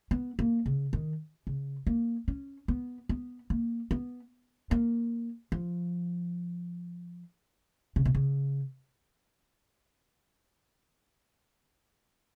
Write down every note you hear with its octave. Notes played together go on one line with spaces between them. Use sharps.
B3
A#3
C#3
D#3
C#3
A#3
C#4
B3
B3
A#3
B3
A#3
F3
C#3
B2
C#3